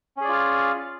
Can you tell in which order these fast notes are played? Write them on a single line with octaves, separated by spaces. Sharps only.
C#4 G#4 D5 F4 F5